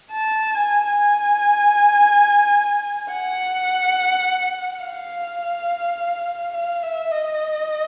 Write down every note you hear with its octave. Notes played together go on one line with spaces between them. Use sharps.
A5
G#5
G#5
F#5
F5
F5
E5
D#5